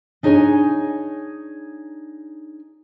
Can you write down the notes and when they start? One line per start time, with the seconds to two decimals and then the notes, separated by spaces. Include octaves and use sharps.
0.23 D4 D#4 G#4 C#5 F#5 G#5